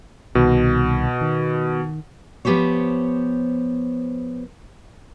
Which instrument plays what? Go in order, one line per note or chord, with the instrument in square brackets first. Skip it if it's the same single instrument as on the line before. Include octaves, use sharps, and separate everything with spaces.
[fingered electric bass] C2 D#3 [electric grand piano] B2
[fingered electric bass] D#3
[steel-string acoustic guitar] F3 B3 G4 C5 C#5